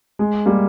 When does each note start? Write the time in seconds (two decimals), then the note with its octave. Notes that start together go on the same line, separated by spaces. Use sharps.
0.19 G#3
0.46 G3 A#3